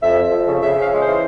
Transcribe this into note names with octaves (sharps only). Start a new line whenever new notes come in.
F2 E5
F2
F3
C#3
C#3 E5
C#4 F5
G#3
E3 C5